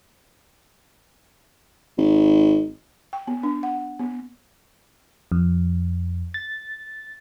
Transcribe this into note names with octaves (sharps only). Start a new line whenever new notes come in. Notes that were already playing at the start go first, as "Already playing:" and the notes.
G#1
G5
B3
D4
F#5
B3
F2
A6